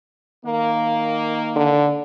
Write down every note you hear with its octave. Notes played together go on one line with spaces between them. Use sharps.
D#3 A#3
D3